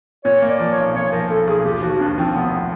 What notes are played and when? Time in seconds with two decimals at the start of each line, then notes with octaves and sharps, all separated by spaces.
0.25 A#2 C#5
0.42 A#3
0.48 D5
0.59 F3
0.71 C#5
0.77 B1
0.95 A#2 C#5
1.12 F3 A#4
1.29 B1 A4
1.47 B1 G#4
1.64 D#2 G4
1.82 F3 F#4
1.99 D#2 D4
2.17 F3 C4
2.34 F1 B3